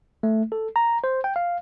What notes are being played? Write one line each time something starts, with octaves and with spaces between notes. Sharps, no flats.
A3
A4
A#5
C5
G5
F5